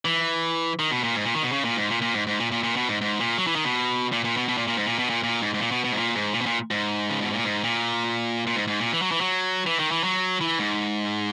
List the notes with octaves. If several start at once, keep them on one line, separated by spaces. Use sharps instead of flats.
E3
D#3
B2
A#2
G#2
A#2
D#3
B2
C#3
A#2
G#2
A#2
A#2
G#2
G#2
A#2
A#2
A#2
B2
G#2
G#2
A#2
F#3
E3
D#3
B2
A#2
A#2
B2
B2
A#2
A#2
G#2
A#2
B2
A#2
A#2
G#2
G#2
A#2
B2
B2
G#2
A#2
G#2
A#2
B2
A#2
G#2
C#3
B2
A#2
G#2
A#2
A#2
G#2
G#2
A#2
E3
F#3
E3
F#3
E3
D#3
E3
F#3
E3
G#2